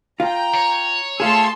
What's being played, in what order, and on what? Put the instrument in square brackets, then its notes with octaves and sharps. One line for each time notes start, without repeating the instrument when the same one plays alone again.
[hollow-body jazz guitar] F4 [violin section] G5 A#5
[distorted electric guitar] C#5
[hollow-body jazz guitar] A3 F4 G#4 [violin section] A5 C6 E6